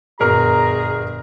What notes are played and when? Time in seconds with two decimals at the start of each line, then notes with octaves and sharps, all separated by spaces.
0.20 G1 F#2 A#2 B3 G#4 A#4 A#5 F6